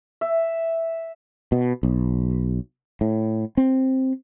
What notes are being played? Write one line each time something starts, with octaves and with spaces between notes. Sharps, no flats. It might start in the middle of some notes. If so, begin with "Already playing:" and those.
E5
B2
B1
A2
C4